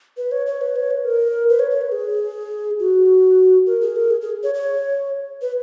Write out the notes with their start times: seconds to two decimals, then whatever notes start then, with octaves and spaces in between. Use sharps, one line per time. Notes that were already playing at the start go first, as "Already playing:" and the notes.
0.17 B4
0.31 C#5
0.46 C#5
0.61 B4
0.76 C#5
0.90 B4
1.05 A#4
1.49 B4
1.59 C#5
1.71 C#5
1.81 B4
1.92 G#4
2.80 F#4
3.67 A#4
3.81 G#4
3.96 A#4
4.11 G#4
4.21 G#4
4.43 C#5
4.54 C#5
5.42 B4